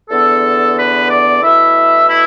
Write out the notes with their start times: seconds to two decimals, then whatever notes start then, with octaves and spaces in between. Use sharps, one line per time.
0.09 E2 D3 B3 A4
0.76 B4
1.09 D5
1.42 B2 A3 E4 E5
2.08 E4